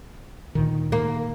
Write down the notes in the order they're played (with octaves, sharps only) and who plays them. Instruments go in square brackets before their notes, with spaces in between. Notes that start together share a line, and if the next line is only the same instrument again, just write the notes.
[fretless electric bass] D2 A#2 D#3
[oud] A#3